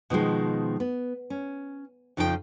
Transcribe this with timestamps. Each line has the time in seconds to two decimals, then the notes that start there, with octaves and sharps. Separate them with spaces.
0.10 B2 D#3 F3 G#3
0.80 B3
1.30 C#4
2.17 F2 C#3 F3 D#4 F#4 G5